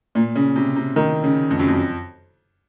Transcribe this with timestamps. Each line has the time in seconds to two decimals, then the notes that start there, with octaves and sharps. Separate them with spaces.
0.15 A#2
0.36 C#3
0.56 C3
0.76 C3
0.96 D#3
1.24 C#3
1.50 F2
1.59 F#2
1.68 F2